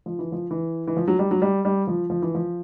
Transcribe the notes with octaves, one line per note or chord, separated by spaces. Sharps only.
F3
E3
F3
E3
E3
F3
F#3
G3
F#3
G3
G3
F3
F3
E3
F3